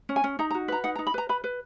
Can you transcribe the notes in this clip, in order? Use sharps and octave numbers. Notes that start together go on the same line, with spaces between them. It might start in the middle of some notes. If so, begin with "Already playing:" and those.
C#4
G#5
C#4
D#4 A#5
A#5
F#4
B4 A#5
D#4 F#5
A#5
D#4
B5
B4 A#5
B4 B5
B4